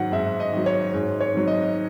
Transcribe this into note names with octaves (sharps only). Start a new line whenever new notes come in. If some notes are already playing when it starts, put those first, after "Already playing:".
Already playing: G#2 D#3 F#3 F#5
G#2 E5
D#5
D#3 F#3
C#5
G#2
C#5
D#3 F#3
D#5